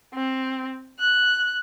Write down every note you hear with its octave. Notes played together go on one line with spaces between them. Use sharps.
C4
F#6